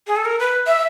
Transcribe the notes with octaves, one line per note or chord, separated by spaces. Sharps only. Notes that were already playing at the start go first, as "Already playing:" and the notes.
G#4
A4
A#4
B4
E5